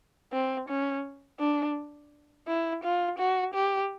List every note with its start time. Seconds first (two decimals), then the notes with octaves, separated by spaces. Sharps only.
0.32 C4
0.69 C#4
1.40 D4
2.47 E4
2.84 F4
3.18 F#4
3.54 G4